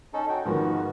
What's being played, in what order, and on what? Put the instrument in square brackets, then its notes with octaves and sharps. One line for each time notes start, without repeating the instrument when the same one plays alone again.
[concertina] C#4 D#4 A4
F#4 G5
[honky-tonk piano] G#2 D#3 F3 [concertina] B3 F#4